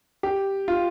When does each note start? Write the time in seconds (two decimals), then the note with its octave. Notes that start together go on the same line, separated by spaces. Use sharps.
0.23 G4
0.68 F4